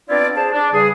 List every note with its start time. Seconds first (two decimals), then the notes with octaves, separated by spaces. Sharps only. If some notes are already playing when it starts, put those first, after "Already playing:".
0.09 B3 C4 D4 E4 F4 D5
0.36 D4 G#4 C5 A5
0.53 D4
0.73 E2 C#3 G3 G#4